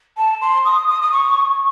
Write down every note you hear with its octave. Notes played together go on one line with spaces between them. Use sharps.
A5
C6
D#6
D#6
D#6
C#6